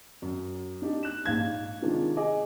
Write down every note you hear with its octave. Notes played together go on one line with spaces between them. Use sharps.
F#2
D4 D#4 G4
F#6 E7
A#1 G#2 F5 G#6
C3 D#3 G#3 D4 F4
G#4 D#5 D6